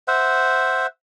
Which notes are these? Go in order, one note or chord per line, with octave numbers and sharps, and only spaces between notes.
C5 E5 F#5